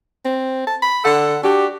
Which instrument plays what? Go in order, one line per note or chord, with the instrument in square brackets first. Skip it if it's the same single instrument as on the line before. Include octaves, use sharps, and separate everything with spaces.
[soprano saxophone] C4
A5
B5
[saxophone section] D3 A4 [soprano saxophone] F#5
[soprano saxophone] D4 [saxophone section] F#4 G4